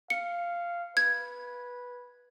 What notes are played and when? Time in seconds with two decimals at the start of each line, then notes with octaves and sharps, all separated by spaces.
0.10 F5 C#7
0.97 B4 G#6